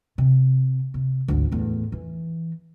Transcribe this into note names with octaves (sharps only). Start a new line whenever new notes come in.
C3
C3
G#1 D2
E2 A2
E3